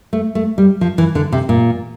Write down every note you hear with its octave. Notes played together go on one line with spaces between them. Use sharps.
A3
A3
G3
F3
E3
D3
C3
A#2